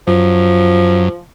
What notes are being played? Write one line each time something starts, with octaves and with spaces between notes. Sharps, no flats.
F#2 F3